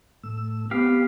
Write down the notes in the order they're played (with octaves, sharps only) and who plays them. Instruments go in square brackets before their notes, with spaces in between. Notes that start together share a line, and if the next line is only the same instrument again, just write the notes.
[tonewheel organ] A2 A3 E6
[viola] B3 [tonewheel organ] C4 [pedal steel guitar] G4 F5